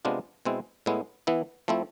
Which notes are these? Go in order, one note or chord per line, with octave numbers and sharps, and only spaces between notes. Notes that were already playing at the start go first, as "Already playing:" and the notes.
C3 G#3 B3 D4 F4
B2 G#3 C4 E4
A2 G#3 B3 E4
E3 B3 E4
F3 A3 C4 E4